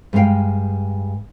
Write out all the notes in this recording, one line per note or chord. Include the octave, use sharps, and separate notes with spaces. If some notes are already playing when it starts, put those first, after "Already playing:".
G2 G#3 D#4 F5 G5